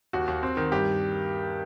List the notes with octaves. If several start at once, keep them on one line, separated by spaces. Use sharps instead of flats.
D#2 F#4
D#2
C4
D#3
G2 G4